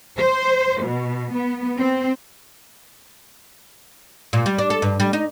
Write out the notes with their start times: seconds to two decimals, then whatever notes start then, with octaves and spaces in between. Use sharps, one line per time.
0.18 C5
0.82 B2
1.35 B3
1.78 C4
4.33 A#2
4.46 G3
4.59 D4
4.70 A4
4.82 G2
5.00 G3
5.13 D#4